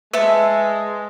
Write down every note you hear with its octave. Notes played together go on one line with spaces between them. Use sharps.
G#3 B4 E5 A5